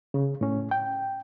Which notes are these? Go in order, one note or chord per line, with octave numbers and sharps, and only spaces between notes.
C#3
A2 C#4
G5